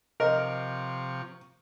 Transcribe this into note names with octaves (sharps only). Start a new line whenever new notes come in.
C3 F3 A#4 C5 D#5 F5 C#6